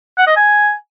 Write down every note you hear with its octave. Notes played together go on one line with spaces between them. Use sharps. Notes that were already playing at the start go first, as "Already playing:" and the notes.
F#5
D#5
G#5